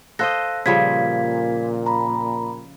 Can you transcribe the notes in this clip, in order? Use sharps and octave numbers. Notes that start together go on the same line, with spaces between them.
A4 C5 D#5 F5 F#6 A#6
A#2 C#3 F3 G3 F5 G#6 B6
A#5 B5